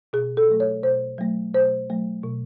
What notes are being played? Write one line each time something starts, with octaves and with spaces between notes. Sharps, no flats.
B2 G#4
A4
F#3 A3
C#5
B2 C5
F#3 A3
B2 C5
F#3 A3
B2